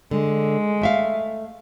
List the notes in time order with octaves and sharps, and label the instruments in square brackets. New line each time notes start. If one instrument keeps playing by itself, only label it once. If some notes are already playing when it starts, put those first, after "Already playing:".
[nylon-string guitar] D3 [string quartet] G#3
[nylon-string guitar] A3 E5 F5